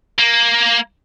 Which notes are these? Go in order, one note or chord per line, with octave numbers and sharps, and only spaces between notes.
A#3